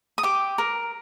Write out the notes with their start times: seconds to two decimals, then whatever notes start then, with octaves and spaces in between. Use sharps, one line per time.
0.18 D#6
0.23 G4 D6
0.58 A#4